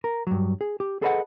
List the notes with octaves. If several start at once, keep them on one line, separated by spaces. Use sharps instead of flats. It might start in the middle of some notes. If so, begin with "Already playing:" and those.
A#4
G2 F#3
G#4
G4
G#4 A4 B4 D#5 E5 F#5